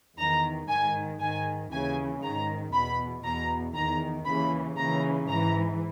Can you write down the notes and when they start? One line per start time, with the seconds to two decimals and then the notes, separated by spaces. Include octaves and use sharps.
0.18 E2 D#3 A#5
0.69 G#2 D#3 G#5
1.20 G#2 D#3 G#5
1.71 D#2 C#3 E3 G#5
2.22 G#2 D#3 A#5
2.73 E2 B2 B5
3.24 E2 B2 A#5
3.75 E2 D#3 A#5
4.26 D#2 C#3 E3 B5
4.77 D#2 C#3 E3 A#5
5.28 G#2 E3 A#5